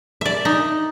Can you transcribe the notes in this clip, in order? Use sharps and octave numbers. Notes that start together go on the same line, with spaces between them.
D5 E5
D#4